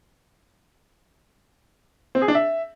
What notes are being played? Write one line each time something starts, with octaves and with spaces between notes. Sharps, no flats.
C4
G#4
D4
E5